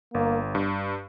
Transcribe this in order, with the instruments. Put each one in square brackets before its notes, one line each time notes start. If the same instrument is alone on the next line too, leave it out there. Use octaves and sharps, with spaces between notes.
[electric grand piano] G1 [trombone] A#3
[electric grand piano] G2